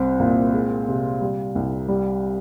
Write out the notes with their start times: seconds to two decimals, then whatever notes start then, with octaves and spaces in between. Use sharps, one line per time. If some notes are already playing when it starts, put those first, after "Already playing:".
Already playing: C2 C4
0.20 A#2
0.53 G#3
0.88 C3
1.21 G3
1.55 C2
1.88 G3